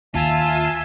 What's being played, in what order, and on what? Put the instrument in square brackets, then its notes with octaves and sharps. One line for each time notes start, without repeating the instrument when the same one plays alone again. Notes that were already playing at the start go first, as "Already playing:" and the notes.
[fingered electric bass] D#2 [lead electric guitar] F4 [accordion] E5 G#5 [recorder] A5